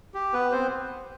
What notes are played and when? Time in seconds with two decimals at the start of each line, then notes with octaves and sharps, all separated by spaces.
0.14 G4
0.33 B3 B4
0.52 C4 C5